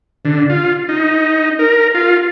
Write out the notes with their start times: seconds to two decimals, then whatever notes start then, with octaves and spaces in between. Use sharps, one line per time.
0.25 D3
0.50 F4
0.89 D#4
1.59 A#4
1.95 F4